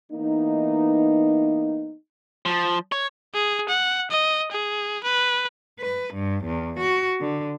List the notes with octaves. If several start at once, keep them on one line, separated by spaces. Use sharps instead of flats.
E3 A#3 B3 D#4
F3
C#5
G#4
F#5
D#5
G#4
B4
B4
G2
E2
F#4
D3